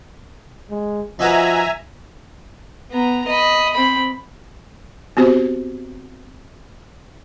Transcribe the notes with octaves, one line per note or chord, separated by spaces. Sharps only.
G#3
F3 D#4 F#4 B4 E5 G#5 A#5
B3 A#5
D#5 B5
C4 B5
B3 C4 F#4 G4 C5